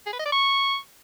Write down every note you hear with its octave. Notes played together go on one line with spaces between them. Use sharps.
G#4
B4
D#5
D5
C#6